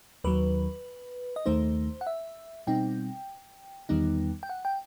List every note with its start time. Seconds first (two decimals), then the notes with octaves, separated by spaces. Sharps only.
0.24 D#2 D#3 F#3 B4
1.36 D#5
1.46 D#2 D#3 A3 D#4 C5
2.01 F#5
2.07 E5
2.67 B2 G3 C4 D#4 G5
3.89 E2 D#3 G3 B3 D#4
4.43 G5
4.49 F#5
4.65 G5